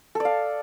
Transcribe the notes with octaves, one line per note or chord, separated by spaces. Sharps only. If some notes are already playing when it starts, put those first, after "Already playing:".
A4 D5 F5